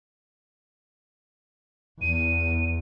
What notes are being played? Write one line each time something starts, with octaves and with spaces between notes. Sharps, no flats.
E2 D#7